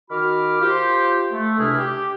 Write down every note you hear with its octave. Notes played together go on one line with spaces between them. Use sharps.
D#3 F#4 B5 D6 F6
F4 G4 C5
A3
C#2 C3 D4 E4 G#4 F6
G4